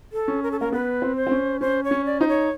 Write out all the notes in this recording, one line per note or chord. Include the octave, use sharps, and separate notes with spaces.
A4
C#4
A#4
A4
A#3 A#4
B3 B4
C4
C5
C4
C#4
C#4 C5
C#5
C#4
D5
D#4 C5
C#5